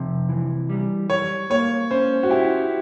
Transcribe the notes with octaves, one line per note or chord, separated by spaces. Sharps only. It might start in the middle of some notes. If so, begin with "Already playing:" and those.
Already playing: F2 C3
E3
G3
G3 C#5
A#3 C#5
C#4 C5
F#4
E4 G4